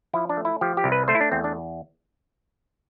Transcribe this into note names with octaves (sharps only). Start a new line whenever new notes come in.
F3 E4
D4
A3
E4
F3 G4
G4
C2
B4
A3 C5
E4
D4
E2 C4
D4